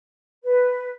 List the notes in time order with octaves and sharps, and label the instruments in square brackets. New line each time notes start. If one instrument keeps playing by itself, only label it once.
[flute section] B4